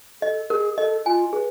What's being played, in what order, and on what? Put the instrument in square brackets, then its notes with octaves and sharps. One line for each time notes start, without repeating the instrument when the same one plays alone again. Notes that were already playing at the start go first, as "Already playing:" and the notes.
[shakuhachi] A4 [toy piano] D#5
[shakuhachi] G#4 [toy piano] A#4
[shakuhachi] A4 [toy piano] D#5
[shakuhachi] F4 [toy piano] G#5
[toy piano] G#4 [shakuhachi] B4